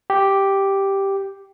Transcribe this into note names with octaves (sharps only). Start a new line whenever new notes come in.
G4